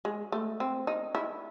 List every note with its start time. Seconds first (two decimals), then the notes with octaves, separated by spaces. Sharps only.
0.05 G#3
0.32 A3
0.60 C4
0.87 D#4
1.15 E4